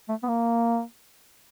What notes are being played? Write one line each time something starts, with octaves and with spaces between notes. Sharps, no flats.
A3
B3
A#3